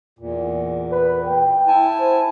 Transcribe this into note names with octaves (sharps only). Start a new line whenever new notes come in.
E2 A#2
B4
G5
E4 G#5 A5
C5